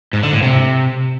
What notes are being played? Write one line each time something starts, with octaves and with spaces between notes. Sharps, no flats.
G#2
D3
A2
C3